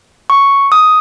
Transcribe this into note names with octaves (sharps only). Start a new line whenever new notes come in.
C#6
D#6